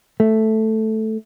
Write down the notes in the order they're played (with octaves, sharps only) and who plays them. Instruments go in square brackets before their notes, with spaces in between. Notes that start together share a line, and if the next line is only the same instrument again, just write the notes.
[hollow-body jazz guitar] A3